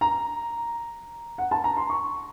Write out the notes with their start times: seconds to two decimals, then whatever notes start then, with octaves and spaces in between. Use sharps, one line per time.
0.01 A#5
1.38 F#5
1.51 A5
1.64 A#5
1.77 C6
1.90 C#6